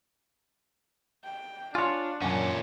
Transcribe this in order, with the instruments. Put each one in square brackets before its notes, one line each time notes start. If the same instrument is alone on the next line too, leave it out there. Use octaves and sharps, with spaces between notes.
[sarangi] G5
[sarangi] D4 [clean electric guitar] F4 C#5 [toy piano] G#5 C6
[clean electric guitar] F#2 [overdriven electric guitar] A#2 C#4 [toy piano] F#5 G#5 A5